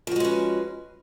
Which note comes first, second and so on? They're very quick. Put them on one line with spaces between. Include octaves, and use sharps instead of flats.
F3 F#4 G#3 C#4 B4